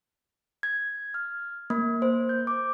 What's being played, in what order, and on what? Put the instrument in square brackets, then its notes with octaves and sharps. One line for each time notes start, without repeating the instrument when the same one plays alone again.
[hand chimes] G#6
F6
A#3
C5
G6
D6